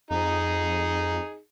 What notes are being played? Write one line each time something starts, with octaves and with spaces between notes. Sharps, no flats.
F2 D#4 G#4